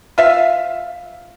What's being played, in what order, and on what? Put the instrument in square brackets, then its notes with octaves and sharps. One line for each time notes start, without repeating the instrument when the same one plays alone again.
[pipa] F4 E5 F5